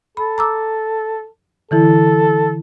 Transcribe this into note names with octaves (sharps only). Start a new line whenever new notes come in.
A4 B5
A#5 D6 E6
D3 E3 E4 A4